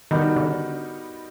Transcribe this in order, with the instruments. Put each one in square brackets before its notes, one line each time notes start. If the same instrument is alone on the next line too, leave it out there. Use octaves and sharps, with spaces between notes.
[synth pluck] D#3 [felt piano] G3 B3 D#4 F#4 A#4
[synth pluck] D3